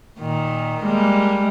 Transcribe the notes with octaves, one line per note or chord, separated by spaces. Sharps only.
A#2 D#3
G3 G#3 A#3